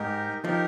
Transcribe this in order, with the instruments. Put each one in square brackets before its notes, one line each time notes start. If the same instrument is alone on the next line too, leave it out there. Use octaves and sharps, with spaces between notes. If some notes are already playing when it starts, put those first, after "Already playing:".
Already playing: [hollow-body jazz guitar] G#2 [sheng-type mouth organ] D#4 G4 A#4
[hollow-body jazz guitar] F3 [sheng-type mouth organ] D#4 G4 A#4